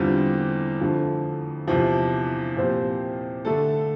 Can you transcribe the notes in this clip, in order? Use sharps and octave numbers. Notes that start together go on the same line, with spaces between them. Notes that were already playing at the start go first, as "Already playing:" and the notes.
Already playing: E2 D3 G3 C4 F4
F2 D3 F3 A3
E2 C3 F3
A#2 F3 C4 G4 C5
D3 A3 D4 A4